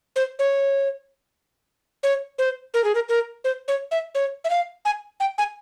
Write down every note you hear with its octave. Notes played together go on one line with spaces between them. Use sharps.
C5
C#5
C#5
C5
A#4
G#4
A#4
A#4
C5
C#5
E5
C#5
E5
F5
G#5
G5
G#5